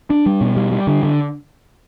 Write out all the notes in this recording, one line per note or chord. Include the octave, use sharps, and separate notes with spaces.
D4
G3
B2
G3
G3
D3
D3